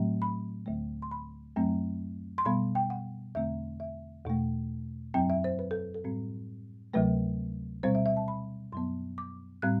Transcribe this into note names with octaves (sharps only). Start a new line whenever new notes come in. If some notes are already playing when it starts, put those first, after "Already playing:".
Already playing: A2 F#3 A3 C4
B5
D2 D3 A3
C6
B5
F#2 F#3 A3 C4
C6
B2 G3 B3 B5
G5
F#5
E2 D3 A3 C4 E5
E5
E2 B2 A3
F#2 F#3 C4 G5
E5
C5
B4
A4
A4
A2 G3 C4
D2 C3 F#3 A3 B4
B2 G3 C4 C5
E5
E5
A5
B5
F#2 F#3 B3 C6
D6
A2 G3 C4 F#6